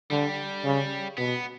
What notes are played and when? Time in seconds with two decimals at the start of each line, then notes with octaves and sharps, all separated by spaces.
0.11 D3 G3
0.64 C#3
1.18 B2 B3